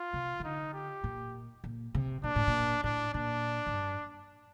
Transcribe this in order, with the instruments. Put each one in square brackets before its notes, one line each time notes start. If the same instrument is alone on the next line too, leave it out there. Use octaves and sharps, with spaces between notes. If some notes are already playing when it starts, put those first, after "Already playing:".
Already playing: [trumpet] F4
[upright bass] C3
D#3
[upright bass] D3 [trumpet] D#4
[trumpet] G4
[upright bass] A#2
A#2
C3
[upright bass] A#2 [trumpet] D4
[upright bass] A2
A#2
[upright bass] A2 [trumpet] D4
[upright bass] A#2 [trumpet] D4
[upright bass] A2
G2